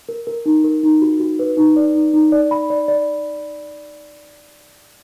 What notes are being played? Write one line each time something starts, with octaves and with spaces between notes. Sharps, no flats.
A#4
A#4
D#4
A#4
D#4
F#4
F#4
B4
D#4
D5
D#4
D#4
D5
B5
D5
D5